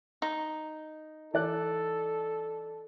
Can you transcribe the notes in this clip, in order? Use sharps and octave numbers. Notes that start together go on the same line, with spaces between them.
D#4
E3 A4 D5 F#6